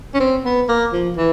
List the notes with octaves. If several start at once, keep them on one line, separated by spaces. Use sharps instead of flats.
C#4
C4
B3
A#3
F3
E3